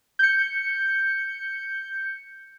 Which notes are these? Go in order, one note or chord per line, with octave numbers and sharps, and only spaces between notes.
G6 C#7